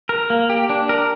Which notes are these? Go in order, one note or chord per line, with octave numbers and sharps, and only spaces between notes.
A#4
A#3
G4
D4
A#4